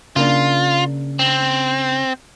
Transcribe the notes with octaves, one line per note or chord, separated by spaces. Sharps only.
C#3 A#3 D4 F4
C4